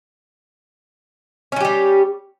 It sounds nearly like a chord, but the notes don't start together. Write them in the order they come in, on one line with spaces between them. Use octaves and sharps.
C#4 F#3 G4 G3